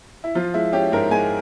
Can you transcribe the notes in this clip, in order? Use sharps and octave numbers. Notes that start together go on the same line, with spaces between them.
E4
F3 F4
G#3 E4
C#4 G4
G#2 A#4
G#3 G#5